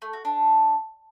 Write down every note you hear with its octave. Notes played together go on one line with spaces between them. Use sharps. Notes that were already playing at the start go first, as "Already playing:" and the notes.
A3
F#4
D4